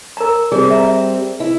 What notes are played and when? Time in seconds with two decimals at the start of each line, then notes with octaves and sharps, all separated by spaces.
0.17 A#4 A#5
0.52 G3 C4 G#4
0.70 E5 A#5
1.40 E4